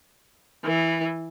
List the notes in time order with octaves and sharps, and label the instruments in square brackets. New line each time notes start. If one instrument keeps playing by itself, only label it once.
[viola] E3